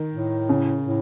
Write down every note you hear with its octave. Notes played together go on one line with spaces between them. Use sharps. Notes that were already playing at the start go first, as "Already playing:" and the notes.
Already playing: D#3
A2
C#3
A2